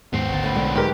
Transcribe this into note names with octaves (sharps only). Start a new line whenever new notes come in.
D#2 G#2 B3 C5
G#1 D2 A5 C#6
A2 C#4 B5
B1 D3 G#3 A3
G#2 E3 F#3 G4 A#4 B4